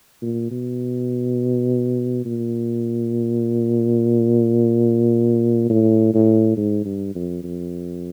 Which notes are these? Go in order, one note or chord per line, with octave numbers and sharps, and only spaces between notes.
A#2
B2
A#2
A2
A2
G#2
G2
F2
F2